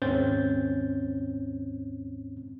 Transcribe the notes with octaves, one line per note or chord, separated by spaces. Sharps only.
D#2 G#2 C4 C#4 G6 A6